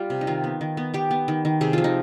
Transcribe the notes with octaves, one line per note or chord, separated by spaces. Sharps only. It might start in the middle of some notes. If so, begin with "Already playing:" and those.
Already playing: G3 F4 G4
C3
D#4
D#3 F4
B3
D#3
B3
B3 G4
B3
D#3
D#3
C3 G#4
F3 F4
D#4